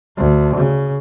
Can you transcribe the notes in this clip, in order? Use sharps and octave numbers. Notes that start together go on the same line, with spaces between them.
D2
C#3